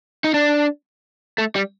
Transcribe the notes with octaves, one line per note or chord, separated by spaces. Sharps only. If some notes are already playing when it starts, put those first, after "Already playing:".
D#4
D4
A3
G3